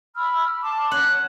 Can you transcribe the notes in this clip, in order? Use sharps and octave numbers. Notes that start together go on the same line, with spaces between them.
B5 E6 F6
A5 C6 D6
C#4 F#5